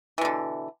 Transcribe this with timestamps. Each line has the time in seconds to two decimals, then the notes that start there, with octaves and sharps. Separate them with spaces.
0.18 E3
0.21 B2
0.25 D3